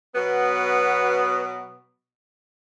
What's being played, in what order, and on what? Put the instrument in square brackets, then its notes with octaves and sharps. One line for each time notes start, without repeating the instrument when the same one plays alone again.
[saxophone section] B2 F#3 B3